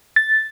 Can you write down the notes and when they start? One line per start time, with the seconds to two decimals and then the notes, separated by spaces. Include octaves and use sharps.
0.16 A6